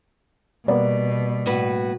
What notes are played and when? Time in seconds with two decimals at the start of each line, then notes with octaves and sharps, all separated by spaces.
0.68 B2 G3 A#3 B3 D5
1.46 A2 F#4 B4